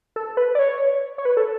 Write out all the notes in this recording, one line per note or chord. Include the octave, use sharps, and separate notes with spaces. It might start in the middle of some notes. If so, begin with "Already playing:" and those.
A4
B4
D5
C#5
C#5
B4
A4